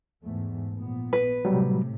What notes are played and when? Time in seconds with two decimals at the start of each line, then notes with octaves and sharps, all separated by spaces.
0.23 E2 G#2 A3
0.73 A#1 A#2 B3
1.13 B4
1.45 A2 C3 F#3 G3